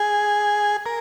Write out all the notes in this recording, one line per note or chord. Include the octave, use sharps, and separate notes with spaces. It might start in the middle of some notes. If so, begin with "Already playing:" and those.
Already playing: G#4
A#4